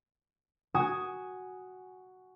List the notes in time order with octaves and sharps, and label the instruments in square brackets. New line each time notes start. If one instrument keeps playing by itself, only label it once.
[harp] F#4 G#5 D#6